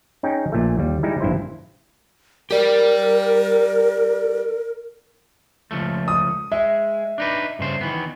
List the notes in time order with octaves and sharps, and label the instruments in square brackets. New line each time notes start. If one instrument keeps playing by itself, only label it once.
[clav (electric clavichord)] C#4 D#4 G#4 G5
A#1 A#2 A3
D#2 G3
G3 G#3 D#4 E4
A#1 G2 E4 C5
[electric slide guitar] G4 D5 [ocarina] A#4
[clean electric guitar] C#2 F3 A3
[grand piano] D#6
[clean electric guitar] G#3 [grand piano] E5
[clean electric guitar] D4 D#4 B4
G2 C#3 C5
D#3 E3 B3